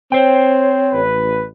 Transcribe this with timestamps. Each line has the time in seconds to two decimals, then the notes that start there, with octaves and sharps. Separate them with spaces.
0.12 C4 C5 C#5 G5
0.92 A1 B4